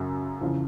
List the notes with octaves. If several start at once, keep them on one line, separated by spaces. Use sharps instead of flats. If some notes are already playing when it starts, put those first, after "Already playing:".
Already playing: F#2 C#3 F#3
F2 C#3 E3